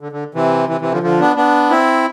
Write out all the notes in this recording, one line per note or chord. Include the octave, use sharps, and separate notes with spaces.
D3
D3
C3 E3
C3 E3
C3 E3
D3 F3
D3 F3
B3 D4
B3 D4
C4 E4